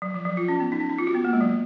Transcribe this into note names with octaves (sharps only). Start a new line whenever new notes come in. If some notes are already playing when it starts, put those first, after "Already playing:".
F#3
F3
F#3
F4
C#4
B3
D#4
C#4
D#4
F4
F#4
B3
A#3
G#3
F#3